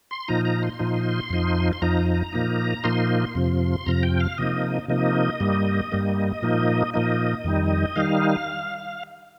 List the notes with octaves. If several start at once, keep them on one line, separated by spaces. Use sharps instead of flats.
C6
A#2 F3 D#4 A#5
A#5
C6
A#2 F3 D#4
F2 F3 D#4
C6
F2 F3 D#4 A#5
A#2 F3 A#3 D#4
A#2 F3 A#3 D#4 C6
F2 C3 F3
F2 C3 F3 A#5
G5
F5
C3 F3 A#3 D#4 D#5
C3 F3 A#3 D#4 D#5
G2 G3 A#3
G2 G3 A#3
A#2 F3 A#3 D#4
A#2 F3 A#3 D#4 D#5
F2 D#3 G3 D#4
D#3 G3 D#4 F5